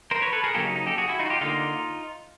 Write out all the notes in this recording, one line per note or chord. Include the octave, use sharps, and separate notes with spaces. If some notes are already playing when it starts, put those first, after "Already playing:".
A#4 C5
B4 C#5
A4 B4
G#4 A#4
C#3 F#3 A#3 C#4 G4 A4
D#4
D#4
G4 A4
F#4 G#4
E4 F#4
D#4 F4
F#4
F4 G4
D3 G3 A#3 D#4 F4